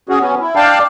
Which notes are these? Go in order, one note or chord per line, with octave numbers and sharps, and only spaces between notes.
C#4 F#4 G#4
F#3 B3 C#4
E4
D4 D5 F5 G5 A5